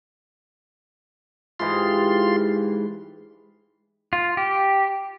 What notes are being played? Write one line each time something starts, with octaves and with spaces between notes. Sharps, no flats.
G#2 E3 F4 G4 C6
F4
G4